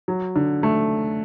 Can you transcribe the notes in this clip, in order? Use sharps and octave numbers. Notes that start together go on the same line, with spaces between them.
F#3
D3
A3